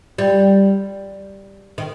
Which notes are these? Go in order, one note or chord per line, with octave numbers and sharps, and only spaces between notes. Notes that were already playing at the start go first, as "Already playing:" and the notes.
G3
D#3